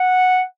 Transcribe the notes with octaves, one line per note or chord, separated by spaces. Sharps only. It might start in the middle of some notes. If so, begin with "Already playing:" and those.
Already playing: F#5